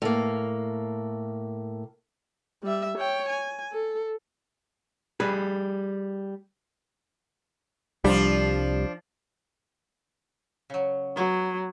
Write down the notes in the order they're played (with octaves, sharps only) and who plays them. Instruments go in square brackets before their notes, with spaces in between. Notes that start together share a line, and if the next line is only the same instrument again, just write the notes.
[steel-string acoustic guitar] A2 A#3
[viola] G3 E5
C#5 G5
G#5
A4
[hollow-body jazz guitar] G3 G#4 B4
[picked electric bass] C2 G3 [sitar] F3 D4
[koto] C#3 F#3
[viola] F#3 [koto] B3